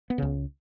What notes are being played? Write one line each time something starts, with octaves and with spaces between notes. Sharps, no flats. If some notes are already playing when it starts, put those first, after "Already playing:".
B3
C#2 C#3